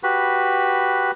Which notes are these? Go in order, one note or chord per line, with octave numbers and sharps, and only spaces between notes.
F#4 G4 B4 B5